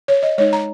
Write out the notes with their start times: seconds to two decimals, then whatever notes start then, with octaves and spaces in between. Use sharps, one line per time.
0.08 C#5
0.23 D#5
0.38 G#3 D#4 C#5
0.53 A#5